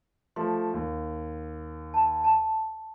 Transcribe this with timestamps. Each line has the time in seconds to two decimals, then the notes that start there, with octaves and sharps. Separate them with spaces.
0.36 F3 A3 C6
0.74 D#2
1.94 A5
2.24 A5